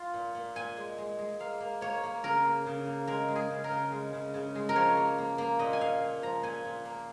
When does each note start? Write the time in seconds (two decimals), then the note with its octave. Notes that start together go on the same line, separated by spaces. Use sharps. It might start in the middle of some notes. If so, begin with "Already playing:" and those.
Already playing: F4
0.14 A#2
0.35 A#2
0.55 A#2 G#5
0.77 G#3
0.98 G#3
1.19 G#3
1.40 A#3 F5
1.60 A#3
1.81 A#3 C#5
2.03 A#3
2.24 C#3 A#4
2.45 A#3
2.66 C#3
2.87 A#3
3.07 G#3 A#4
3.29 G#3
3.35 G#4
3.50 C#3
3.64 A#4
3.71 C#3
3.92 G#3
4.13 C#3
4.34 C#3
4.55 G#3
4.69 A#4
4.75 F3 C#5
4.97 A#3
5.18 A#3
5.38 A#3
5.59 A#2 D#5
5.73 G#5
5.80 A#2 F5
6.02 A#2
6.22 F3 A#5
6.43 A#2 G#5
6.65 A#2
6.85 A#3